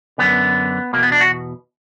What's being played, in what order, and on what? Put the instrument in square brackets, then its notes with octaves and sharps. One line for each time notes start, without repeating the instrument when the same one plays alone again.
[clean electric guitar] F#2 D3 B3
E2 B2 A#3
B3
D4
F#4